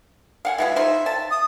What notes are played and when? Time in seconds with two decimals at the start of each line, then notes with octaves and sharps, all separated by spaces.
0.45 F5 F#5 G#5
0.58 E3 G#3 F4 E5
0.76 D#4 F4 C5
1.06 A5
1.31 D#6